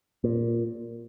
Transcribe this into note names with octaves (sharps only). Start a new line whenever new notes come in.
A#2